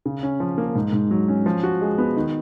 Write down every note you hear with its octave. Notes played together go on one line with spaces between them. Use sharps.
C#3
C#4
F3
A#3
G#2
G#2
F#3
C#4
F3
F#4
G#3
B3
D#3